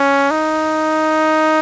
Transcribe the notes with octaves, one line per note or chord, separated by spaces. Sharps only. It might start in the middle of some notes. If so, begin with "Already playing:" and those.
Already playing: C#4
D#4